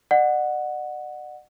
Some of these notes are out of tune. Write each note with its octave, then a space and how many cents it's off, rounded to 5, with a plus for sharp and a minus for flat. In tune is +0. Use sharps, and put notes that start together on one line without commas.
D5 +45 F#5 -5